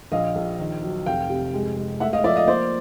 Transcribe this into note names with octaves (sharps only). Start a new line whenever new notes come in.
A#1 D#5 F5
A#1
D#3
F#3
F1 F5 G5
C3
G#3
G#3
A3 E5 F#5
D#5 F5
F3 D5 E5
D#5 F5
A#3 C5 D5